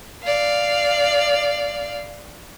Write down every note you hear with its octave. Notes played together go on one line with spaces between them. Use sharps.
D5 F5